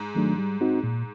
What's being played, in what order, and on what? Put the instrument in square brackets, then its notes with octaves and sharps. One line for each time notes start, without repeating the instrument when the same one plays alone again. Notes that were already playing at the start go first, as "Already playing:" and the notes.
Already playing: [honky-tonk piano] G#2
[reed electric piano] D#3 F#3 A3 D4
G3
C4 D#4 F#4
A#2